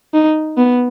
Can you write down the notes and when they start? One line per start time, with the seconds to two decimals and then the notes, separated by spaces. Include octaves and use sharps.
0.14 D#4
0.57 B3